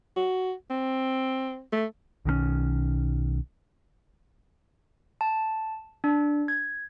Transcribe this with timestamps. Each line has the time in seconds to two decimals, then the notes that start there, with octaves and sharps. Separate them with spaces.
0.17 F#4
0.70 C4
1.72 A3
2.25 B1 D#3 G3 C#4
5.21 A5
6.04 D4
6.48 G#6